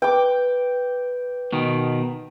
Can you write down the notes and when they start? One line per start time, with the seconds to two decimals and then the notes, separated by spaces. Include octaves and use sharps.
0.02 B4 G5 D6
1.53 B2 D#3